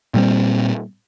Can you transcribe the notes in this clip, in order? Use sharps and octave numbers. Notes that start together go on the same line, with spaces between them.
A#2 G3 C4